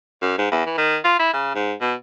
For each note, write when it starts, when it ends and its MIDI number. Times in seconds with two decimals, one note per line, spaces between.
0.22 0.37 42
0.38 0.50 44
0.52 0.64 40
0.66 0.74 52
0.78 0.98 51
1.04 1.18 65
1.19 1.33 64
1.33 1.52 49
1.55 1.73 44
1.81 1.94 47